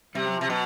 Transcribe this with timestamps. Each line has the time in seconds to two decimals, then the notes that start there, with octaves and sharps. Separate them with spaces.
0.15 C3 G3
0.26 F#3
0.36 F3
0.41 C3
0.46 B2 F#3